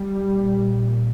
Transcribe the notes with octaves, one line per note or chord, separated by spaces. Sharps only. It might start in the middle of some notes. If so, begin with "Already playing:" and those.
Already playing: G3
A#1 A#2